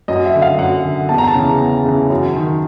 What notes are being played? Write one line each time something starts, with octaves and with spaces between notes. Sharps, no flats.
F#2 D#5
E5
D3
F5
F#2 F#5
D3
E2 A5
A#5
A5
C#3 E3
E2
C#3 E3
F#2
D#3